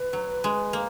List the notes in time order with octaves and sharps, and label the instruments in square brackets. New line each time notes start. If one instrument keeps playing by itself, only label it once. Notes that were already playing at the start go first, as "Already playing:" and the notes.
Already playing: [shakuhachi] B4
[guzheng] F#3
G#3
A#3